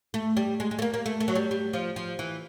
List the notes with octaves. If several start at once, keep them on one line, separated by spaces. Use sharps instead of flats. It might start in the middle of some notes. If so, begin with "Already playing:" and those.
A3
G3
G#3
G#3
A3
A#3
A#3
A3
A3
F#3
G3
G3
F3
F3
E3